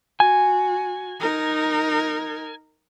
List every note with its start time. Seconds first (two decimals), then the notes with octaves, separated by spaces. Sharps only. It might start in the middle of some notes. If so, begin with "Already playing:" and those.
0.20 F#4 G#5
1.20 D#4 A#4